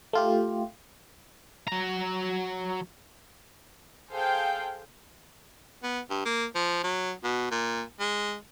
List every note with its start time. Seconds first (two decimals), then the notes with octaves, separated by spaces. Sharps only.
0.13 A3 F4 G4
1.67 F#3 A#5
4.10 G#4 A4 C5 F5 G5
5.83 B3
6.10 G2
6.26 A#3
6.55 F3
6.84 F#3
7.24 B2
7.51 A#2
8.00 G#3